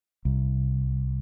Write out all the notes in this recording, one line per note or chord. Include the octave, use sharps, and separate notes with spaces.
C2